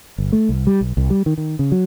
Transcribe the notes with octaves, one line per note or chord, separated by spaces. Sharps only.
G1
A3
C2
G3
B1
C2
G3
D#3
D#3
C#3
F#3